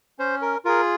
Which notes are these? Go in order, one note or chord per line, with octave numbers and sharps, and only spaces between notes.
C#4 C5
A#4
F4 G#4 A#4